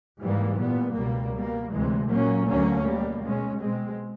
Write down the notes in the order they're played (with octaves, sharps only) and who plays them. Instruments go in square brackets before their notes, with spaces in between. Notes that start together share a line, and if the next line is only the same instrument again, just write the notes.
[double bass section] G#2 E3 G3 A#3
A#2 G3 B3
C#2 B2 G3 A#3
B2 G3 A#3
D2 C3 E3 G#3
A#2 F#3 A#3 C#4
D2 D3 F#3 A#3 C#4
B2 G3 A#3
B2 G#3 C#4
B2 G#3 C4